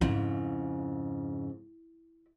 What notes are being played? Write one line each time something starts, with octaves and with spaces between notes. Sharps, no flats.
F2 G#2 C#3 E4